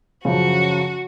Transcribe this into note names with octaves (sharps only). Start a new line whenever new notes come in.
F#2 C#3 F3 F#4